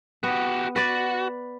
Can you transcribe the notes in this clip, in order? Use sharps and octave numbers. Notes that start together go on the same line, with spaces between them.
B3 F#4 G4
F#4 B4 D5